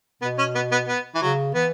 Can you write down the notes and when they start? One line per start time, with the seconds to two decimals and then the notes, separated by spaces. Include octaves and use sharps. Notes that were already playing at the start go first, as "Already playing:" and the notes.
0.22 B2 B3
0.38 C#4
0.55 B3
0.72 B3
0.88 B3
1.15 E3
1.21 C#3 F#3
1.55 E3 B3